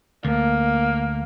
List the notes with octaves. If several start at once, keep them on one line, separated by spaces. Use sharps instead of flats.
D2 A#3